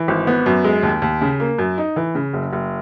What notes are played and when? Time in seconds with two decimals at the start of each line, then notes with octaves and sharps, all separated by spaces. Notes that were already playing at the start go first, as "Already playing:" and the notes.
Already playing: E3
0.08 G#1
0.27 B3
0.46 F#2
0.64 G#3
0.83 D#2
1.02 D#2
1.21 C#3
1.40 A#3
1.58 F#2
1.78 D#4
1.96 E3
2.15 C#3
2.34 F#1
2.53 F#1